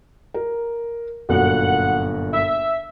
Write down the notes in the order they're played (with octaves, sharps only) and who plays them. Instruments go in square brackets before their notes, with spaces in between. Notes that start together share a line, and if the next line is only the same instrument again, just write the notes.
[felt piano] A#4
[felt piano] G1 F#2 A#2 [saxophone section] F#5
[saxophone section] E5